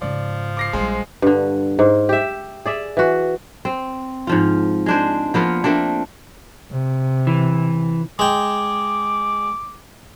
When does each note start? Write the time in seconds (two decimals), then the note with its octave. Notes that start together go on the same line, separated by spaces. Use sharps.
0.02 G#2 C#3 F3 D5
0.57 D6 A#6 C7
0.73 A#1 G3 G#3 C5
1.22 G2 D3
1.79 G#2
2.09 G4 E5
2.66 G#4 D5 E5
2.97 E3 F#4
3.65 C4
4.27 G#2 F3 F4
4.86 G#3 D4 C5
5.34 F3 A#3 B3 F4
5.64 A3 A#3 C4 D4
6.72 C3
7.27 E3
8.19 G#3 G5 D6